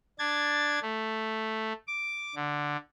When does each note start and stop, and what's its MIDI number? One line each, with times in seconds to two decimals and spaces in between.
0.19 0.79 62
0.19 0.79 92
0.19 0.79 93
0.82 1.73 57
1.87 2.35 86
2.35 2.77 50